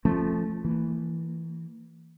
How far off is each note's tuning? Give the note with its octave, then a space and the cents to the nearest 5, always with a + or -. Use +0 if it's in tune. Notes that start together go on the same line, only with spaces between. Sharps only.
F3 -15 A3 -5 C#4 -35
E3 +0 A#3 -30